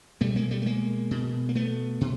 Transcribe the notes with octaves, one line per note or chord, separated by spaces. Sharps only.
B2 G3 A3
G#3 A#3
G3 A3
A3
G#3 A#3
B2
A#3
A3 B3
B2